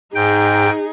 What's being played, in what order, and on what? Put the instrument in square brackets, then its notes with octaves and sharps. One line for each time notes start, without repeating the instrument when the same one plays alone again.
[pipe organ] G#2 G5 [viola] D#4 G#4